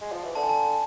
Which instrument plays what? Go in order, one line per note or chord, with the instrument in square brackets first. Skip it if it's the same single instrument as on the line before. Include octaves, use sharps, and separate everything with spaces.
[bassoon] G#3
F3
E3
[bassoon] D3 [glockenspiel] A5
[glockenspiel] G#5
A5